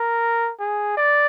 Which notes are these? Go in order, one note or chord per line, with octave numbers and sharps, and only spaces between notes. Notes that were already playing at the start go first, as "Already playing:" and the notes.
Already playing: A#4
G#4
D5